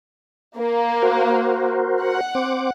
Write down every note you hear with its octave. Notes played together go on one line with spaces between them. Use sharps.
A#3
F#4 A#4 C5
F#5
C4 C5 D6